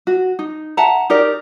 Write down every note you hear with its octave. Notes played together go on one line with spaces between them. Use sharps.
F#4
D#4
E5 F#5 A5 A#5
D#4 G4 A#4 D5